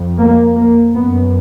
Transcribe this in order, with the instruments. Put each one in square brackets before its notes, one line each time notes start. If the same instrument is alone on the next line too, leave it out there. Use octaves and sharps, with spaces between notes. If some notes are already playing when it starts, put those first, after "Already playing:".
Already playing: [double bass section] F2
A#3
A#3
F#2 B3